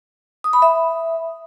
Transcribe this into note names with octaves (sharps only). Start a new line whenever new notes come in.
D#6
B5
E5